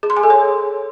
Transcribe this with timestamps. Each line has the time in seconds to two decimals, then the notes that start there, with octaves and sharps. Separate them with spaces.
0.03 G#4
0.10 C6
0.17 G#5
0.23 A4
0.30 C#5